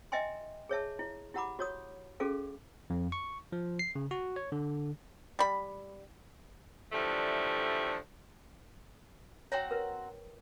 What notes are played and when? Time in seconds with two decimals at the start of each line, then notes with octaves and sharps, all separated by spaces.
0.12 D#5 E5 G5 G#5 C6
0.69 G#4 C#5 E5 A5
0.99 E4
1.34 E4 G4 F#5 A#5 B5 D6
1.59 F#4 C#5 D#6
2.20 C#4 F#4 G#4 A4 F5
2.90 F2
3.12 C#6
3.52 F3
3.79 C7
3.95 C#3
4.11 F#4
4.36 C#5
4.52 D3
5.39 G3 B5
6.93 D3 E3 F3 G3 A3
9.52 C4 F#4 C#5 G5 A#5
9.71 A#4 B4